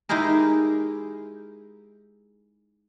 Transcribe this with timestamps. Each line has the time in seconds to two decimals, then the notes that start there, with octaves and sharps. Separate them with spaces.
0.09 G#3 D#4 E4 G4 G#4 A#4